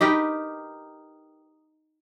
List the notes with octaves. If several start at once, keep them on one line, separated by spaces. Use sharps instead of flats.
D#4 G4 A#4 B4